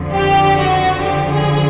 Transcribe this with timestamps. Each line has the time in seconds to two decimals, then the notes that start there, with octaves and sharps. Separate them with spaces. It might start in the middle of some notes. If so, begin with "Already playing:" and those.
Already playing: F2 D3 F3
0.14 G4
0.58 F#4
1.03 G4
1.32 G#4